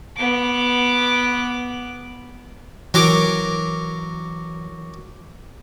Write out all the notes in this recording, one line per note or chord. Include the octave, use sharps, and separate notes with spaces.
B3 D6
E3 F#3 A#4 D6